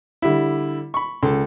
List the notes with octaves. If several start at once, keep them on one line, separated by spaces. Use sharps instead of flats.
D3 G3 E4
B5 C#6
C#2 A4 C6